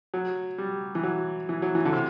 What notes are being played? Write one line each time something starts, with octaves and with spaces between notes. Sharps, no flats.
F#3
G3
E3
F#3
E3
F#3
E3
D3
C3